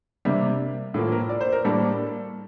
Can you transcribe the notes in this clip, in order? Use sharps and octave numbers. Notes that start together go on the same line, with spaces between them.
C3 G3 A#3 D4
A2 F3 A#3
A#4
D5
C5
A#4
A2 G3 A#3 D4 A4